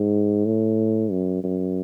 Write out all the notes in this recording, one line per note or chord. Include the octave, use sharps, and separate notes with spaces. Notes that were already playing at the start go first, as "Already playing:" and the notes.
Already playing: G#2
A2
F#2
F#2